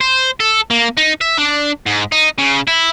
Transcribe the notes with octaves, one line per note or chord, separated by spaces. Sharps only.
C5
A4
A#3
D#4
E5
D4
G#2
D#4
C#3
E4